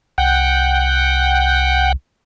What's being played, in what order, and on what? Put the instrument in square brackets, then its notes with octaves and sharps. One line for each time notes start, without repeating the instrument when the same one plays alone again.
[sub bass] C2 [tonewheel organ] F#5 G5